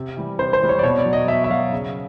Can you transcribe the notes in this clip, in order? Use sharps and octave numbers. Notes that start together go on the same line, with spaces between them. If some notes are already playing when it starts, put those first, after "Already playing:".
Already playing: C3
E3 G3
C3 C5
C5
E3 G3
C#5
D5
B2 C#5
D5
F#3
D#5
B2 E5
E5
F#3 F5
C#3